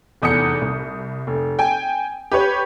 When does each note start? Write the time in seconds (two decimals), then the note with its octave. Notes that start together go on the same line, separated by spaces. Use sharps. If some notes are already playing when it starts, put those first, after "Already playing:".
0.22 F1 E2 D#6 G6 C#7
0.61 C2
1.27 F1
1.59 G5 G#5
2.31 G4 B4 C#5